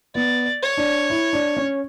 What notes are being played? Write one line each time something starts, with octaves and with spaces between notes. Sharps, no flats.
B3 D5
C#5
D4
E4
D4
C#4